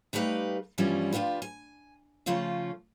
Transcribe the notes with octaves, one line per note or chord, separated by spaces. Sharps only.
G3 A3 D#4 G4 B4 F5
G2 B2 E3 F3 G3 C#4
F3 D4 F4 G4 B4
G#5
C#3 F3 A3 C#4 F4